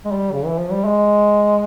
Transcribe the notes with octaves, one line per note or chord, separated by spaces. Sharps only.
G#3
G3
C#3
E3
F3
G3
G#3